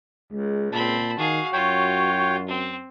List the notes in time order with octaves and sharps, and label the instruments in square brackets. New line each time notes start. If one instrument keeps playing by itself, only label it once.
[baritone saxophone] C#2 [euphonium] G#3
[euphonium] A#2 [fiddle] C4 B5 [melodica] A5
[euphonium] D#3 [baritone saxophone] F#4 [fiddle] G#4 F5
[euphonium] F#2 [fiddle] F4 [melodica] C#5 G5
[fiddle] C4